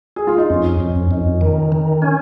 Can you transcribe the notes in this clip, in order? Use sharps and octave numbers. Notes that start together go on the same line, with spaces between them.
G#4
F4
D#4
F2 C#4
F2
F2 D#4
D#3
D#3
C#4